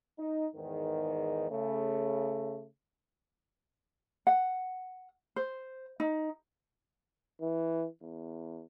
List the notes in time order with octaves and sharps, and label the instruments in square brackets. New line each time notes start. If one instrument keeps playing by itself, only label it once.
[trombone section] D#4
E2 G#2 D#3
C#3 A3
[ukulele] F#5
C5
D#4
[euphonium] E3
E2